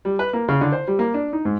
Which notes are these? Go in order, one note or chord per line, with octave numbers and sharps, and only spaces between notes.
G3
B4
A#3
C#3
D3
C5
G3
A#3
D4
D#4
G#2